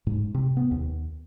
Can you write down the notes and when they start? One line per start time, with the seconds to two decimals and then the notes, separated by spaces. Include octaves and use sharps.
0.07 G#2
0.34 C3
0.57 B3
0.71 D#2